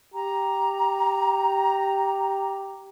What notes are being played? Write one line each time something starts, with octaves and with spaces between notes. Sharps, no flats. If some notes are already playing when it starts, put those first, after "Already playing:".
G4 A#5